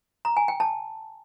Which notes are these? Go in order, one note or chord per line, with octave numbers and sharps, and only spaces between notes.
A#5
G#5
G5
A5